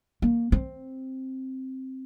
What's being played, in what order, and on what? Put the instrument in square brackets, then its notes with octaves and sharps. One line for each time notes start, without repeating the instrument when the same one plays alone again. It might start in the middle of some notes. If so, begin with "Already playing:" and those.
[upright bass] A#3
C4